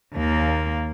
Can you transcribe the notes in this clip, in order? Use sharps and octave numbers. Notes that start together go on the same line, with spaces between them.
D#2 A#3